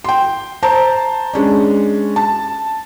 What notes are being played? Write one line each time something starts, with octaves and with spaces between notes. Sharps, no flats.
G5 C6
C5 A5 A#5
G#3 C#4 D4
A5